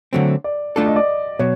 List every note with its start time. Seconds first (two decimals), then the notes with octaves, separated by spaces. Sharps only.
0.13 D3 F#3 A3 C4
0.44 D5
0.76 A3 D4 F4 A4 D5
0.86 D#5
0.96 D5
1.39 B2 F#3 C#5